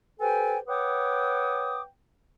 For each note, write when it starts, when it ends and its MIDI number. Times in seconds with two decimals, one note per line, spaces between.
0.20 0.58 67
0.20 0.58 69
0.20 0.58 71
0.20 0.58 72
0.20 0.58 79
0.20 0.58 80
0.68 1.81 71
0.68 1.81 73
0.68 1.81 78
0.68 1.81 79
0.68 1.81 86
0.68 1.81 87